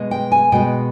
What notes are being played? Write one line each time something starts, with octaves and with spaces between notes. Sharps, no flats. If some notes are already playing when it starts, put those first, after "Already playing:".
Already playing: B2 G#3 B3
G5
G#5
B2 G#3 B3 G5